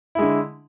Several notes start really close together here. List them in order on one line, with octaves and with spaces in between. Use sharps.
E4 G#3 D3